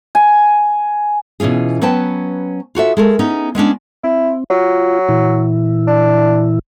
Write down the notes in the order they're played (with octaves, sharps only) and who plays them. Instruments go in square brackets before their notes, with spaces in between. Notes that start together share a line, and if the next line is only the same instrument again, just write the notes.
[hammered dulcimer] G#5
[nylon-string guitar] B2 E3 C#4 F4 G#4
F#3 B3 C#4 B4 G5 A5
F4 F#4 A4 E5
G#3 A4 A#4
B3 C#4 D#4 G#4
G#3 B3 C#4 D4
[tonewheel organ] C4 [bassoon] E4
[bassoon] F#3 [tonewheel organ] F4
[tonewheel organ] A#2 E3 E4
[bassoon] D4